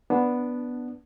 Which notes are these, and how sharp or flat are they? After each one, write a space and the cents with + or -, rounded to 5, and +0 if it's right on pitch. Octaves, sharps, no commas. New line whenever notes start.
B3 +0 D4 +0